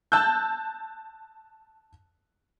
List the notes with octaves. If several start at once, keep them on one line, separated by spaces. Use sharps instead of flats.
A5 E6 F#6 G6